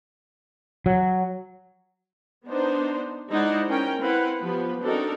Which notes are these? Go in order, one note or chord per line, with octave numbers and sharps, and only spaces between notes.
F#3
B3 D4 D#4 C5
G#3 D#4 E4 C5 D5 F#5
C#4 A#4 G5
C4 E4 B4 F5 F#5
F3 B3 G4 B4
C4 D4 D#4 F#4 A4 A#4